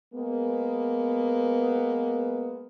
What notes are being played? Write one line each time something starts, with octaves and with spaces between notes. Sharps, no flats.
G#3 A#3 B3